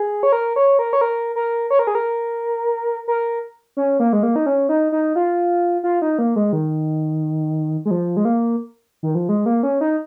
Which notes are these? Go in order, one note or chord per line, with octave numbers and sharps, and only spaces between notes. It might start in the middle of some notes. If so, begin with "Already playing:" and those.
Already playing: G#4
C#5
A#4
C#5
A#4
C#5
A#4
A#4
C#5
A#4
G#4
A#4
A#4
C#4
A#3
G#3
A#3
D#4
C#4
D#4
D#4
F4
F4
D#4
A#3
G#3
D#3
G#3
F3
G#3
A#3
D#3
F3
G#3
A#3
C#4
D#4